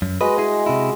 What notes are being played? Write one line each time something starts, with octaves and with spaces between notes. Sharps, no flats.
F#2
G#3 F#4 B4 D#5
E4 G#4
C3 E4